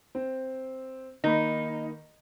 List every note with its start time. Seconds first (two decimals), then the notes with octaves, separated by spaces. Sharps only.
0.15 C4
1.24 D#3 A#3 D#4 B5